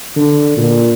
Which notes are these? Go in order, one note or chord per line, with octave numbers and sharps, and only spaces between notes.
D3
A#2